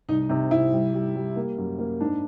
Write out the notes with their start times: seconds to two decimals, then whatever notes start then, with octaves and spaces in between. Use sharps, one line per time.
0.09 C2 D#4
0.29 C3 D#4
0.51 C3 E4
0.73 G3
0.94 G3
1.15 G3
1.36 A#3
1.58 F#2
1.79 A#3
2.00 G#2 D4